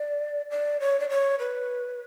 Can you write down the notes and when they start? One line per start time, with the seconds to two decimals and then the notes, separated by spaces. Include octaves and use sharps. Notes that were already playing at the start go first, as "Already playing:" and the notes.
Already playing: D5
0.51 D5
0.80 C#5
1.00 D5
1.09 C#5
1.39 B4